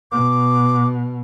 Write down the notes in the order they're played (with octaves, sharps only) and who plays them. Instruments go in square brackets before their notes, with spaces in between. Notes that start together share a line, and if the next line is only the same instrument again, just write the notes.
[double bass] B2 [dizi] D6